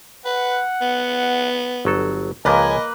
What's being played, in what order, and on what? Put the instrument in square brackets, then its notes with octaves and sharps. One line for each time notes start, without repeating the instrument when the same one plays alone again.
[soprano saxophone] B4 [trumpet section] F#5
[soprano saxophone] B3
[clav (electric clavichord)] G1 F#3 A4
[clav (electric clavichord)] C#2 F3 [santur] A#3 B4 [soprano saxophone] D#5 [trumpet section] G#5